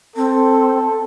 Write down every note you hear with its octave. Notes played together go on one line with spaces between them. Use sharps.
C4 A4